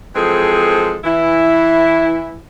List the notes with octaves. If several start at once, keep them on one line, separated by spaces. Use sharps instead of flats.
E3 F3 G#3 C4 G#4 A4
E3 E4